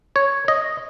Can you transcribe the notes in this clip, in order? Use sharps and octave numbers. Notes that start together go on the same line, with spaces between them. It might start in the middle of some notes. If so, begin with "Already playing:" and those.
C#5
D#5